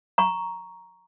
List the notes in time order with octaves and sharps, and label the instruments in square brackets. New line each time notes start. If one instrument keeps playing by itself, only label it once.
[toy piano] A#5 C#6